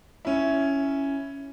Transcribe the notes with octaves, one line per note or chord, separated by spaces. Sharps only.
C#4 E4